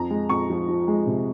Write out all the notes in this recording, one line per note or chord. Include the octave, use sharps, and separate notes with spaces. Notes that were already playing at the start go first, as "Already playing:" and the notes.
Already playing: F2 A#5
G#3
F2 C#6
F3
F3
G#3
C3